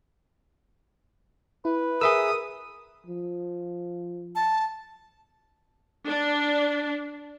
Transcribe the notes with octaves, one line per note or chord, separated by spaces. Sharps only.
E4 B4
G#4 A#4 E5 D#6 E6
F3
A5
D4